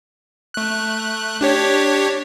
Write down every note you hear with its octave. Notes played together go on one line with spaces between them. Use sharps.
A3 F#6
D4 G4 C#5